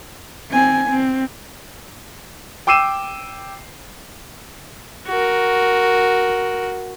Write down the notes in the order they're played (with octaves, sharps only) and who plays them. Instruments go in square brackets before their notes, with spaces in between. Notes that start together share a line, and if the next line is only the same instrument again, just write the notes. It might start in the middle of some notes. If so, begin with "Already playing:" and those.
[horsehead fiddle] C4 G#5
C4
[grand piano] G5 D6 E6 C7 D#7 E7
[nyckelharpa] F#4 A#4